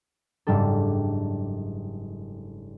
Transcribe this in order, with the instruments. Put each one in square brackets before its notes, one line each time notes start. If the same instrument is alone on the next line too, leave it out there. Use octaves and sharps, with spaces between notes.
[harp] F#1 G#2 G3 D4 A4